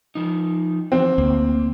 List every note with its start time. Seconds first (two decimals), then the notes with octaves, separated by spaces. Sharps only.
0.15 F3 D#4
0.92 E3 F3 C4 F#4
1.18 D2 A#3